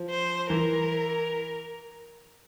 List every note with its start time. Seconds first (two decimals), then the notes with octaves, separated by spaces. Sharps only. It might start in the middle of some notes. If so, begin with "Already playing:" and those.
Already playing: F3
0.10 C5
0.50 E3 A#4